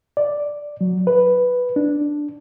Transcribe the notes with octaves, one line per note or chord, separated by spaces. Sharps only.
D5
F#3
B4
D4